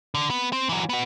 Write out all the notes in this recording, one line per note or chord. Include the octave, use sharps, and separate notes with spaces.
D3
B3
C4
E3 F#3
B3 F#4